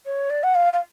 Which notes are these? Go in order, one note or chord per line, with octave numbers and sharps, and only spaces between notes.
C#5
D5
F#5
F5
F5